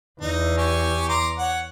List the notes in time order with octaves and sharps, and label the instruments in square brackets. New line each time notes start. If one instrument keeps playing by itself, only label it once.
[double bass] E2 [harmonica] D#4
[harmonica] G4 G#5 C#6
A#5 C6 D6
C#5 F#5